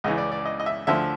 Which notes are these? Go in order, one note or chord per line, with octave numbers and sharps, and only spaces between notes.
C#2 C#3 E3 D#5
D5
D5
D#5
D#5
E5
D2 D3 F3 E5